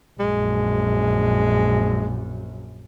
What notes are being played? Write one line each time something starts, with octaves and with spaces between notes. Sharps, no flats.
A#1 F#2 G#3